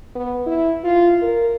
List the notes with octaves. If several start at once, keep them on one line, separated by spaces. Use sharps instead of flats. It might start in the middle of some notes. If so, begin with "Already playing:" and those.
B3
E4
F4
A#4